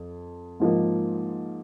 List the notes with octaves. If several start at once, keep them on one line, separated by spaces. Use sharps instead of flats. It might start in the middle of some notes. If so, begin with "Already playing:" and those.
Already playing: F2
G#2 F3 A#3